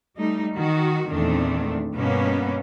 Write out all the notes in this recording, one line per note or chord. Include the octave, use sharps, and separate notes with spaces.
G3 A3 D#4
D#3 F#4
E2 A#2 D#3 A3 C4 D4
G2 B2 A#3 B3 C#4